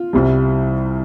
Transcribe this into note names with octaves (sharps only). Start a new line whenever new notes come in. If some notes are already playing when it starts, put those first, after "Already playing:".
Already playing: F4
C2 C3 G3